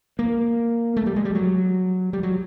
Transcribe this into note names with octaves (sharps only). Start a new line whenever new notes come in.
A#3
A3
G3
G#3
G3
F#3
G3
F#3